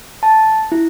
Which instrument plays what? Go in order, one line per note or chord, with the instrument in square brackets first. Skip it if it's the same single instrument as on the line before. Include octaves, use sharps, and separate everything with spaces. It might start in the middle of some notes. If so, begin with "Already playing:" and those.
[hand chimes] A5
E4